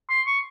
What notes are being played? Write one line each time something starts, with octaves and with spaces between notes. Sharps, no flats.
C6
C#6